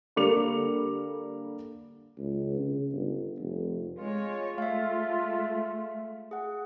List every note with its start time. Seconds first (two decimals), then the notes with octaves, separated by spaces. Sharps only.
0.16 D3 G3 A#3 D6 C#7 F7
2.18 C#2
2.59 C#3
2.93 G1
3.39 F1
3.99 G#3 F4 C#5
4.58 G#3 A3 E5 F5
6.31 G#4 F#5